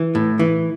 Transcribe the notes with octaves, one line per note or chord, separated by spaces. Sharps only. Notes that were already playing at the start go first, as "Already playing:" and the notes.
Already playing: E3
A2
E3